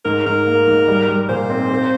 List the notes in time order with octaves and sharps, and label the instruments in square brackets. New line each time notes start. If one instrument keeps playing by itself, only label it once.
[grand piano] G#2 [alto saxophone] A#4
[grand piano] G#2 [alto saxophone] A#4
[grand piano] A#3
G#2
G3
G3
[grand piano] A#2 [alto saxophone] C5
[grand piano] C4
C4